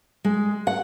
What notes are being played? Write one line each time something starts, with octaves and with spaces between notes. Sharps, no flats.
G#3
F#5